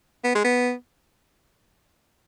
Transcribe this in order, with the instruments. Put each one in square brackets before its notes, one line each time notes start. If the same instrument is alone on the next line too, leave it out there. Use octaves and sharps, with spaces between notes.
[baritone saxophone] B3
G#3
B3